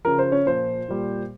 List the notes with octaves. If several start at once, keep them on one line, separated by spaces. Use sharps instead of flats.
C#3 F3 A#4
C5
C#4 C#5
A#2 F3 C5
A#2 G3